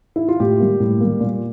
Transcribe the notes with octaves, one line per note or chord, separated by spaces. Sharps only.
E4
F4
A2 G4
G3 A#3
A2
G3 A#3
A#2